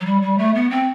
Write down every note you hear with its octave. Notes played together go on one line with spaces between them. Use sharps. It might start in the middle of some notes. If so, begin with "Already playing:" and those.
F#3
G3
G3
A3
B3
C4